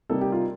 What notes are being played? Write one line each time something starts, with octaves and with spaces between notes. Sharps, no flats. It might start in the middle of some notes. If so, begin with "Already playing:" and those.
C3 G3 A#3 D#4 A4
G4
F4